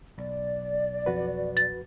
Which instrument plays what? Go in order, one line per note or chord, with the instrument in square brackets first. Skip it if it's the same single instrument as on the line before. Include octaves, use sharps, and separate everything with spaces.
[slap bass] B1 [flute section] D5
[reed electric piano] F2 F#4 B4
[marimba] A6